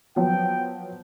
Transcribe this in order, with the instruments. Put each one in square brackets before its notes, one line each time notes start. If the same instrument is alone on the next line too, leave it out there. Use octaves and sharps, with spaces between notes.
[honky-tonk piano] F3 F#3 B3 [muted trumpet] G5